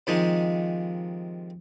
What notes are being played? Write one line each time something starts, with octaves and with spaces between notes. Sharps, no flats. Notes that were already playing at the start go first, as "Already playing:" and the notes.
C3 D#3 F3 G#3 D#4